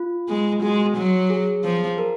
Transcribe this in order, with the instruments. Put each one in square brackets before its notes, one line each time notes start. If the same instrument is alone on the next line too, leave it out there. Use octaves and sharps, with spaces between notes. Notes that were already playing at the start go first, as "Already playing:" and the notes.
Already playing: [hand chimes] F4
[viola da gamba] G#3
[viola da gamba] G#3 [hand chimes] F#4
[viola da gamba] F#3
[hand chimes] G#4
[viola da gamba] F3
[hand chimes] A#4